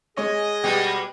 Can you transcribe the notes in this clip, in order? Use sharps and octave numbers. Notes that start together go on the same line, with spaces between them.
G#3 G#4 C#5 D#5
B2 G3 G#3 G4